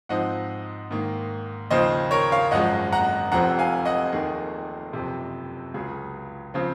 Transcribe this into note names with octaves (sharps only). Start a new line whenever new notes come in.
G#2 F3 C4 D#4 D#5 F#5
G#2 D#3 A#3
D#2 C#3 F3 C5 D#5
A#4 C#5
C#5 F5
G#1 F#2 F3 G#3 D#5 F#5
F#5 A#5
F1 F2 C3 F3 C4 F#5 A#5
F5 G#5
D#5 F#5
F1 D#2 D#3 A#3 D#4 G#4
F#1 F2 C3
C#2 C#3 F#3 G#4
C#3 F3 C4